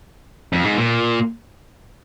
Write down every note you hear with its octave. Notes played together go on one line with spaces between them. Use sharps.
F2
G#2
A#2